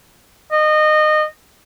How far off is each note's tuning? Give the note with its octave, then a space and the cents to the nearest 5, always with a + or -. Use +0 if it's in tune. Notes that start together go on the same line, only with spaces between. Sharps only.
D#5 -25